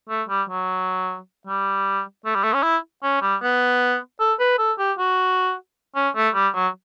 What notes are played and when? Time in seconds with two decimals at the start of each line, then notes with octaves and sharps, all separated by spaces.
0.09 A3
0.29 G3
0.50 F#3
1.47 G3
2.25 A3
2.35 G3
2.44 A3
2.54 C#4
2.63 E4
3.03 C#4
3.22 G3
3.43 B3
4.20 A4
4.40 B4
4.59 A4
4.79 G4
4.99 F#4
5.96 C#4
6.16 A3
6.35 G3
6.54 F#3